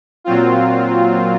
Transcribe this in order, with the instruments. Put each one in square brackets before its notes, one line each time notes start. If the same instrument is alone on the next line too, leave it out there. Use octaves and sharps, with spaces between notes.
[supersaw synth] A#2 F#3 C4 F4